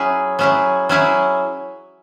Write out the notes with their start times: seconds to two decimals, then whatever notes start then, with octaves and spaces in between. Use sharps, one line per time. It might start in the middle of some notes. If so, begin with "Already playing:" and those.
Already playing: F#3 C#4 E4 G#4
0.39 F#3 C#4 E4 G#4
0.89 F#3 C#4 E4 G#4